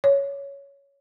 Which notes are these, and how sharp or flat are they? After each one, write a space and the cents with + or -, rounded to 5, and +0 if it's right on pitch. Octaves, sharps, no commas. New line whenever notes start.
C#5 +10